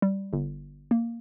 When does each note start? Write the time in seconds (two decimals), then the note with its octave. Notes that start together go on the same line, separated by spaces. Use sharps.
0.02 G3
0.33 G1
0.91 A#3